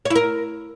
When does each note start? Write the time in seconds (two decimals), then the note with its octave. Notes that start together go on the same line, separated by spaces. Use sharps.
0.05 C#5
0.10 E4
0.15 A#4